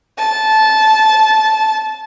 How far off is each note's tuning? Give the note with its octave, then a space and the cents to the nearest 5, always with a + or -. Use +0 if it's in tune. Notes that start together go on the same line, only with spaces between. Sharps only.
A5 -15